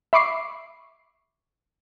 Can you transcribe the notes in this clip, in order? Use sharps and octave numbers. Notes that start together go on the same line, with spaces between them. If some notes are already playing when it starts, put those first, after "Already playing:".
E5 B5 C#6 D6 C7